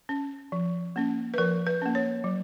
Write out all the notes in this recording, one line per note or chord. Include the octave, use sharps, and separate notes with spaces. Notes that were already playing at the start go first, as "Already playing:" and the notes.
C#4
F3
A#3 C#4
B4
F3 A#4
B4
A#3 C#4
C#5
F#3